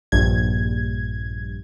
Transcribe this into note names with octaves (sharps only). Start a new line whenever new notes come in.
A#1 G2 G#6